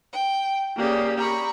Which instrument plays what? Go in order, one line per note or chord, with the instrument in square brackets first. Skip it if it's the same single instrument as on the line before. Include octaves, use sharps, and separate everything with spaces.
[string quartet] G5
[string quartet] C#3 D5 [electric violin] A#3 G4
[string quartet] A#5 B5 C#6